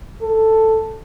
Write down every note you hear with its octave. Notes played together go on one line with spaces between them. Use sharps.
A4